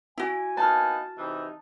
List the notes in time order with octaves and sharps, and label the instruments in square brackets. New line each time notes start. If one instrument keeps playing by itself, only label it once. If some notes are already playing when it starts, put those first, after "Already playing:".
[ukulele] E4 F#4 [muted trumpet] G#5
[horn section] A#3 B3 D#4 [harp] A5 F6
[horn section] C3 E3 [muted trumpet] D#4